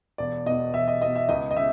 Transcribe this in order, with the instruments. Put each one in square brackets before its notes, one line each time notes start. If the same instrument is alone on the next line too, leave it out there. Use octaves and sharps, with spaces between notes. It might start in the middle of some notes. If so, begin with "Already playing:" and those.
[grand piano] E1 D5
E2 B2 D#5
E1 E5
D#5
E2 B2 D#5
E5
C#2 D#5
D#5
C#3 E5